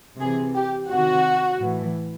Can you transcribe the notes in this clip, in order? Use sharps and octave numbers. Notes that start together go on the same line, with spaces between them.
C3 E3 G#4
G4
C3 D#3 F#4
A2 E3